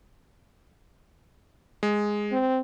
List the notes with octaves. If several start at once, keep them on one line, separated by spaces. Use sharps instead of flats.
G#3
C4